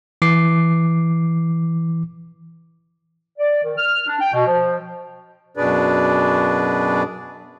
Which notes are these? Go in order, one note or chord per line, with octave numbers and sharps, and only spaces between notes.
E3 D6 C7
D5
D#3
F6
D4
G5
B2
F3
F#2 B2 D4 G#4 B4 D5